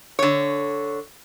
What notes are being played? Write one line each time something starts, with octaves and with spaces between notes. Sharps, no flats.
D3 C#5